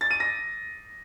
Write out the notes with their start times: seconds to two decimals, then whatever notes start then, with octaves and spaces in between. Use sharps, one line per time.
0.01 A6
0.11 D#7
0.20 A#6